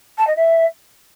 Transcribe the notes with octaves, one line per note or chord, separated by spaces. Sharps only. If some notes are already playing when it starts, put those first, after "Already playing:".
A5
D#5
E5